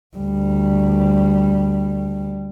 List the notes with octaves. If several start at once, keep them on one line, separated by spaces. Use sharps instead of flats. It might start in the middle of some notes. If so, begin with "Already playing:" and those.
D2 G3